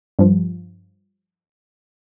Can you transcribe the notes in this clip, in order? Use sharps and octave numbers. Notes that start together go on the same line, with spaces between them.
G2 F3